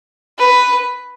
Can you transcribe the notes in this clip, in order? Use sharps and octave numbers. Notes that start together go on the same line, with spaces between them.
B4